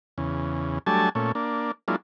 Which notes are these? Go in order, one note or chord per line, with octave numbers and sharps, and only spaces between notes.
E2 C#3
F#3 G3 A3 D4 G#5 A5
A#2 A3 C#4
A#3 D4
F#3 G#3 A#3 D4 E4 F4